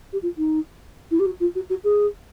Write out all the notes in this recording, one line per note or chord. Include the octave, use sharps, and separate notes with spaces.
G4
F4
D#4
E4
G4
F#4
F4
F#4
F#4
G#4